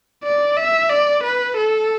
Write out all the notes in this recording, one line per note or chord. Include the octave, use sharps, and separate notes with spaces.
D5
E5
D5
B4
A4